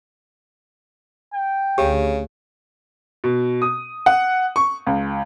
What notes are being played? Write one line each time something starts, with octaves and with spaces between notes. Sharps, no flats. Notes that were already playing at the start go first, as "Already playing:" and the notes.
G5
D2 C#3 G4
B2
D#6
F#5
C#6
C#2